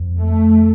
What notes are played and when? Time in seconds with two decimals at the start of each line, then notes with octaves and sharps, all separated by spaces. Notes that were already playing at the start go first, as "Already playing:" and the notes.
Already playing: F2
0.19 A3